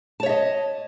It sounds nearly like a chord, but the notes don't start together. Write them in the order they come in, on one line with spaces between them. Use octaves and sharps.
A5 C#5 E5 D#5